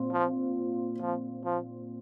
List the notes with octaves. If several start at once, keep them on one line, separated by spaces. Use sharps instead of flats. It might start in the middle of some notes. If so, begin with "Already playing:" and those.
Already playing: A#2 C4 F4
F3
F3
F3